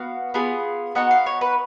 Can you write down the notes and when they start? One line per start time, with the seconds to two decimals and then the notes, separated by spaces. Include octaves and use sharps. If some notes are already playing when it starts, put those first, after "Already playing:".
Already playing: B3 F#4 F5
0.34 B3 F4 G#4
0.95 B3 D#4 F#4 F#5
1.11 F5
1.26 C#5
1.41 B4